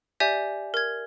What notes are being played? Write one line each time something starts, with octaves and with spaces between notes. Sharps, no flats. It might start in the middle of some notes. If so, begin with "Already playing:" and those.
G4 D5 E5 G#5 G6
A#4 G#6